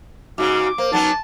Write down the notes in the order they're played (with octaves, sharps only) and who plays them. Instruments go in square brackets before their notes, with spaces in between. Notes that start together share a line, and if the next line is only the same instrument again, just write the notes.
[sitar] G#2 C#3 [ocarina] F#4 [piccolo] D6
[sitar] A#3 [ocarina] C5
[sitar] F#3 B3 C#4 [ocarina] D#4 [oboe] A5